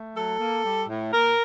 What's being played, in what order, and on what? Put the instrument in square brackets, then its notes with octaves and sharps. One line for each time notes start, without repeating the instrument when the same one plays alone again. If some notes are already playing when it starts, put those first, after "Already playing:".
Already playing: [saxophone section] A3
F#3 A4
A#3
G3
A2
A#2 A#4